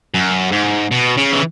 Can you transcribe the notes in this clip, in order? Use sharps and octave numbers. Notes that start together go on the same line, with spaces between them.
F#2
G#2
B2
C#3
E3